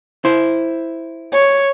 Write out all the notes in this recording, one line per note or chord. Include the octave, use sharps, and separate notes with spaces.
E4 C5
C#5